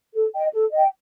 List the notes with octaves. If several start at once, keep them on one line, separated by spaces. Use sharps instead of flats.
A4
D#5 G5
A4
D#5 G5